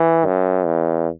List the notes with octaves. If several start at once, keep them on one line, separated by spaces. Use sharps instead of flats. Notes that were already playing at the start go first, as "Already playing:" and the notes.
Already playing: E3
F#2
E2